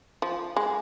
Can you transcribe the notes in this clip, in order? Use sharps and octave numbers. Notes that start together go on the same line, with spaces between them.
F3
G#3